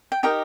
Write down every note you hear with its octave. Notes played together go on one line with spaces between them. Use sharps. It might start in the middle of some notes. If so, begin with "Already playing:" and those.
G5
D#4 G4 A#4 D#5 G5